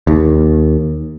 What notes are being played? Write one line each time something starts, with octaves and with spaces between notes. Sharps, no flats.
D#2